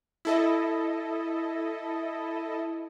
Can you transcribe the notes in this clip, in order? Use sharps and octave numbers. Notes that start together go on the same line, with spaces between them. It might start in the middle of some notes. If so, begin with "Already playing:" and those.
E4 A4 D#5